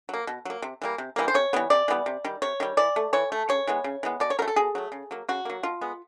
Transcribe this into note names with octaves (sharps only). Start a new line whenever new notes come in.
F#3 A#3
B2
F#3 A#3
C3
E3 G3 A#3
C3
E3 G3 A#3
C5
C3 C#5
E3 G3 B3
C3 D5
E3 G3 B3
C3
D#3 G3
C3 C#5
D#3 G3
E3 D5
A3
E3 C#5
A3
C#3 C#5
E3 G#3 B3
C#3
E3 G#3 B3
B2 D5
C#5
F#3 A3 A#4
A4
B2 G#4
F#3 A3
C#3
F#3 A#3
C#3 F#4
F#3 A#3
B2 F4
G#3 B3